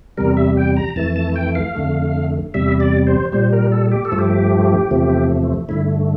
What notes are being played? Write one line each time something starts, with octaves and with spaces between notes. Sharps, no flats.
E2 C3 G3 A#4
E5
G5
A#5
F2 E3 A3 A5
A5
G5
F5
F2 D3 A3
E2 C3 G3 E5
D5
C5
A#2 G3 C5
A#4
A4
G4
A4
G2 F3 A3
G4
E2 C3 F3 A3
G2 D3 A3 E4